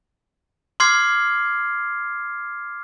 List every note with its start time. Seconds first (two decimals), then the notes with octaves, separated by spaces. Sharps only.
0.80 C6 D6 F6 G#6 C7